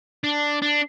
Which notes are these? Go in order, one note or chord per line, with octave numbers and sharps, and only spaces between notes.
D4
D4